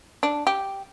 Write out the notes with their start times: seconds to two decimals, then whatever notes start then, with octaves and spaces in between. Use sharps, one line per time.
0.23 D4
0.47 G4